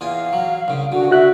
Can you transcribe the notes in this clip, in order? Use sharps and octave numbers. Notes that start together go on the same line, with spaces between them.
E2 F4 F5 G#5
F#3
C2 C#3
D3 F#4
F#4 E5 F#6